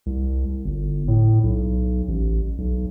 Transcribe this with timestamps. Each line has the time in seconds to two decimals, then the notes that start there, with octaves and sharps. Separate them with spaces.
0.06 C2
0.64 G1
1.08 A2
1.43 B1
2.08 A1
2.58 B1